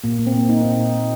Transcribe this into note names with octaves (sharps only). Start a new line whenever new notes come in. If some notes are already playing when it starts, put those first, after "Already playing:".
A#2 A#3
A#2
C4
A#3
A#3 D#4
A#2 C4
D#4
A#2
A#3